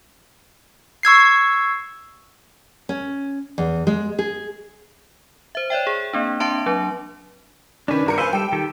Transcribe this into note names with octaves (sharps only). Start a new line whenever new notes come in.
C#6 E6 G#6 C7
C#4
E2
G#3
G#4
C5 E5
C#5 D5 E5 G5
G#4
A#3 C4 D4
C4 D4 E5 A5 C6 D7
F#3 D4
D#3 C#4 D4 B4
G1 A#4 C#7
B4 C5 E5 F5 G#5
G3 A4 G5
D#3 G4 A4